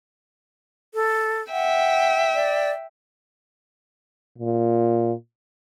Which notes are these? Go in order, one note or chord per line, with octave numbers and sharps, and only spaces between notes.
A4
E5 F#5 G5
D5
A#2